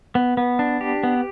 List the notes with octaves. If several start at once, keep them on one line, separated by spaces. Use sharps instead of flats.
B3
B3
D4
G4
B3